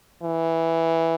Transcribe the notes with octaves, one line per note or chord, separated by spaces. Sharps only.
E3